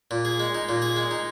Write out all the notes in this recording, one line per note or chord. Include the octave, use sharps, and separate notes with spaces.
A#2
G#4
G#3
D#4
A#2
G#4
G#3
D#4